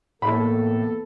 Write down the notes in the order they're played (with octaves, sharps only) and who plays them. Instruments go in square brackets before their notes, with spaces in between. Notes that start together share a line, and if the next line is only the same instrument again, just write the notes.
[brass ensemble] E2 A4 [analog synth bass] A2 [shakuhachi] A#3 [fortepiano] B5